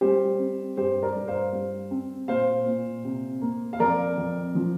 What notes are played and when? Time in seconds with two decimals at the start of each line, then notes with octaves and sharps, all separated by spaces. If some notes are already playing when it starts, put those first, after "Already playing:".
0.01 G3 G4 C5
0.39 C4
0.77 G2 G4 C5
1.02 A#4 D5
1.15 G2
1.27 C5 F5
1.52 G3
1.91 C4
2.28 A#2 C5 F5
2.66 A#2
3.04 C3
3.41 A#3
3.73 F5
3.80 F2 A#4 D5
4.18 F2
4.55 F3